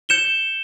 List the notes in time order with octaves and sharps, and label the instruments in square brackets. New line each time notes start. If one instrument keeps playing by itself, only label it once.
[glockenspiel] G6 C#7 E7 G7